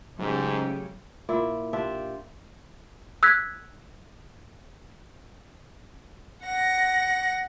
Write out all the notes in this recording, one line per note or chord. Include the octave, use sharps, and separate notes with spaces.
G#2 C#3 F#3 A3 G4
A#2 E4 D5
D4 F4 G4 E5
E6 F#6 G#6 B6
F#5 A#6